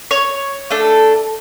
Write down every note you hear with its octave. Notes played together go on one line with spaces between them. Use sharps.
C#5
A3 D4 A4